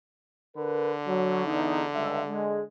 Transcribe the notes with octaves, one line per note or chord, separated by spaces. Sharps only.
D3 A#4 B4
F#3
E2 D#4
C#2 G2 E5
G#3